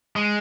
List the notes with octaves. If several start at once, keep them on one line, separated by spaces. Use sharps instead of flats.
G#3